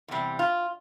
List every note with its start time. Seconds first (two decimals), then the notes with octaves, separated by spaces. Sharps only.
0.08 E2 C3 G3
0.39 F4